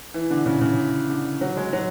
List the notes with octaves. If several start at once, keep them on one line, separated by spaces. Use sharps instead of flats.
E3
D3
C#3
C#3
D3
F#3
G#3
F#3